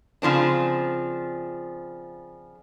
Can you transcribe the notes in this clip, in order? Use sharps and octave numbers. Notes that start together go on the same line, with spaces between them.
C#3 F3 C4 D4